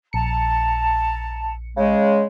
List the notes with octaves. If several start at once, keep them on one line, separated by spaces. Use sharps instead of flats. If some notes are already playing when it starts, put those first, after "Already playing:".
A#1 A5 A#5 C#7
C#3 G#3